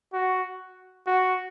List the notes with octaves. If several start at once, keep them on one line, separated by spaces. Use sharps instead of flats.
F#4
F#4